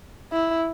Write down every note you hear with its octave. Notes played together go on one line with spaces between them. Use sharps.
E4